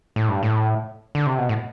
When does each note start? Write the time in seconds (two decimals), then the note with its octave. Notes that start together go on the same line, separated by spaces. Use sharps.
0.16 A2
0.29 G2
0.43 A2
1.15 D3
1.26 C3
1.38 B2
1.49 A2